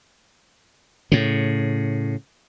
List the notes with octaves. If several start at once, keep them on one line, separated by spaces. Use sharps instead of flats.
A2 C#3